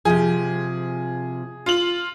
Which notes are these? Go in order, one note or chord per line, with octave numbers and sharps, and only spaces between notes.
C3 F3 G#4
F4 F#7